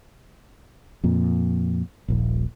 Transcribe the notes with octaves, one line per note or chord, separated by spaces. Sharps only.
F2 A#2
D#1 A#1